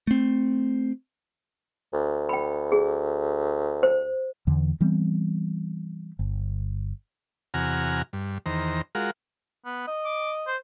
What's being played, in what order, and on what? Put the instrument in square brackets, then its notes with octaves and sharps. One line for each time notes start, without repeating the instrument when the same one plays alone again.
[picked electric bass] A3 C4
[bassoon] D2
[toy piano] G5 B5
G#4
C5
[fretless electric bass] E2 D3 E3
E3 G3 B3 C4
G1
[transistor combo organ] E2 C3 F#4 G#5 A#5 F6
G2
E2 D#3 C5 A#5
G#3 F4 F#4 A#4
[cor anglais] B3
D#5
[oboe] D6
C5